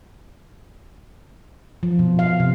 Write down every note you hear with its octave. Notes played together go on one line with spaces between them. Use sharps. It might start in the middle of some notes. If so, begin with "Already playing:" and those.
F3
B2
F5
C3